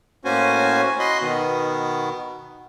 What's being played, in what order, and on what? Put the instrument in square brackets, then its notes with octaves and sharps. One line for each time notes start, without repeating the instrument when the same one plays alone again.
[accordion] A2 A#3 C#4 F#4 C5 G#5
F#4 D#5 B5 C6
B2 D#3 B3